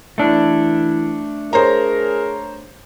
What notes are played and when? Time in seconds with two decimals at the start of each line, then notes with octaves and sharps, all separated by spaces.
0.18 E3 A3 D4 E4
1.53 G#4 A#4 C5 C#5 A#5